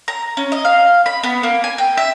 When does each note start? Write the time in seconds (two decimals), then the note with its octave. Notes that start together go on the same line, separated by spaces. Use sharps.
0.08 A#5
0.37 C#4
0.52 D#5
0.65 F5
1.06 B5
1.23 B3
1.43 A#3
1.64 G#5
1.78 G5
1.97 E5